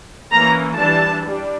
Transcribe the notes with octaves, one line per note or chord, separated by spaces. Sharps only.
E3 A#3 C#4 A#5
E3 G3 D4 A5
G3 D4